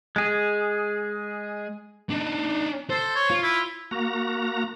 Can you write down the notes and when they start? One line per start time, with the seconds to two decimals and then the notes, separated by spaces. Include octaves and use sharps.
0.16 G#3 G#4
2.11 D4 D#4
2.90 A4 C5
3.15 C#5
3.30 F4
3.43 E4
3.91 A#3 F#4 A#5